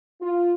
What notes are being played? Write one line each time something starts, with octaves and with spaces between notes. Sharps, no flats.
F4